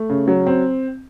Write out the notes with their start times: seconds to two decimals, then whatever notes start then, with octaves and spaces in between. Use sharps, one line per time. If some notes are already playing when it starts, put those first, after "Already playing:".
Already playing: A3
0.09 C#3
0.28 F#3
0.47 C4